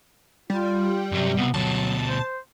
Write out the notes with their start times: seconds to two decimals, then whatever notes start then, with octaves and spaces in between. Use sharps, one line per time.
0.50 G3 F4
1.12 G2 C3 F#3
1.37 B1 C3 B3
1.54 D2 B2 F#3 A5
2.06 C5